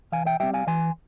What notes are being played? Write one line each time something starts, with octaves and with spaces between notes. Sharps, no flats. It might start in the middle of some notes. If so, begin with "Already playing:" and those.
E3 F5 G#5
E5 G5
G3 C4 E5 G5
F5 G#5
E3 G#5 C6